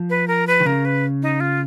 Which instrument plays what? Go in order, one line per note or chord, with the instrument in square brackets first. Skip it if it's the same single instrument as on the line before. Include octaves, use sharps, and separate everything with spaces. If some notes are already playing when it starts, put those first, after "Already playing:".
Already playing: [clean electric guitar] F3
[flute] B4
A#4
B4
[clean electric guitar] D#3
[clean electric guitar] C#3 [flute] A#4
[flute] B4
D#4
F4